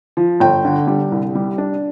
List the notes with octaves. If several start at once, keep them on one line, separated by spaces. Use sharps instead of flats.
F3
G1 G5
D3
G3
C2
G3
D4